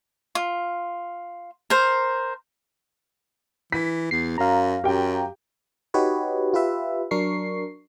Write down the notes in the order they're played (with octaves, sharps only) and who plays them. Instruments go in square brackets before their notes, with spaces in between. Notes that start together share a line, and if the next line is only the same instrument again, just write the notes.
[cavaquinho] F4
A#4 C5
[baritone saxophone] E3 [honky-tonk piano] B6
[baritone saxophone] E2 [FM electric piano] C7
[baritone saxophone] F#2 [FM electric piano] F5 A#5
[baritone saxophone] F#2 [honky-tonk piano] G4 G5
[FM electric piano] D#4 F#4 G4 B4 C#5 D#5
F4 G4 B4 E5
F#3 D4 A#4 C#6 C7